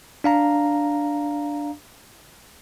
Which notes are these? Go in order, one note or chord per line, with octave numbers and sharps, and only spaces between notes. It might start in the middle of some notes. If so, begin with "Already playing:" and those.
D4 F5 A#5